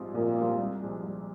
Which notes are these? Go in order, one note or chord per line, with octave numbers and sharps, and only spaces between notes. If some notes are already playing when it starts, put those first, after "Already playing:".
Already playing: A#1 G#2 G3 C4 F4
A#1 A#2
G#2 G3 C4 F4
C2
A#2 F3 G#3
C2